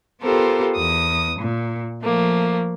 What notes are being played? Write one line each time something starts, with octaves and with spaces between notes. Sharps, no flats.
B3 F4 G4 A4 A#4 C5
E2 D#6
A#2
F3 A3 A#3